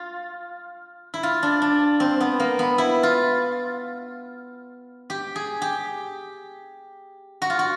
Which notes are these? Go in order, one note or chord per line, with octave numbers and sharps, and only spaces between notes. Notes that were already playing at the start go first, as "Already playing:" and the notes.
Already playing: F4
E4
F4
D4
D4
C4
B3
A#3
B3
E4
F4
G4
G#4
G4
F#4
F4
F#4